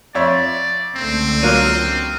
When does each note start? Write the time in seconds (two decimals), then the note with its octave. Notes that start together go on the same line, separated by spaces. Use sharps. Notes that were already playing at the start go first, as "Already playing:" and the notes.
0.15 F2 C#5 D5 E5
0.96 C#2 D3 A3 C4
1.43 F#3 A#3 F4 F6 F#6 D#7